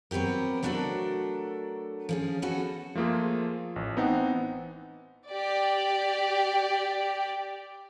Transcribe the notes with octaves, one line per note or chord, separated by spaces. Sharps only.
F#3 B3 C4 G4 A#4
F#3 A3 D4 F#4 A4 A#4
F3 C#4 G#4
B3 C#4 F#4 A4
F3 A3 A#3 F4 G#4
A1
E3 B3 C4 D#4 F#5
G4 D5